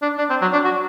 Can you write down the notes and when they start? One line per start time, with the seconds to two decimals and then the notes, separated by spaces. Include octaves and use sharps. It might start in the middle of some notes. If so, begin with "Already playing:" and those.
0.02 D4
0.18 D4
0.30 C4
0.41 F#3
0.53 D4
0.65 F#4